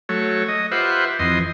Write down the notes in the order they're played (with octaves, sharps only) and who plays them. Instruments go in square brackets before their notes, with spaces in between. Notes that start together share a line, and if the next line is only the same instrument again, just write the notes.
[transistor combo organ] F#3 A3 C#5
D#5
F4 G4 B4 C5 E5 F#5
F2 E3 D#5 C6